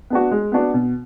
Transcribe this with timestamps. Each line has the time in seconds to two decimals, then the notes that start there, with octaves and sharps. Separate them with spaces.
0.10 B3 D4 F#4
0.32 G#3
0.52 B3 D4 F#4
0.74 B2